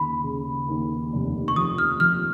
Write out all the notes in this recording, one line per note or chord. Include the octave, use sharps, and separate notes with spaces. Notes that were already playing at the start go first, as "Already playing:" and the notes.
Already playing: D#2 C#3 B5
C#3
D#2
F1
C#6
F3 D#6
F6
F3 F6